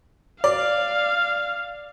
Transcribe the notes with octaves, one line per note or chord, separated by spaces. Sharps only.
D5 F5